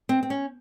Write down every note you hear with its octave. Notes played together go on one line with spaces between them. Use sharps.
C4
C4
C#4